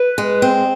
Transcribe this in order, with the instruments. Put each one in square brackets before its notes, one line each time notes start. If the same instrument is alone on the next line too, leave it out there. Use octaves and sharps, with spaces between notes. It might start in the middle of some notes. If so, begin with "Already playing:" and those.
Already playing: [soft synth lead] B4
[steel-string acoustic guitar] G#3
C4